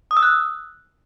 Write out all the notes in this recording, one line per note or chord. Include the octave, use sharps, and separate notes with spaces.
D#6
E6
F#6